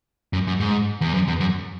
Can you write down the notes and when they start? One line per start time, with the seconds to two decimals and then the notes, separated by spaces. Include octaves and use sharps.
0.33 F#2
0.47 F#2
0.60 G#2
1.01 E2
1.14 F#2
1.28 E2
1.40 F#2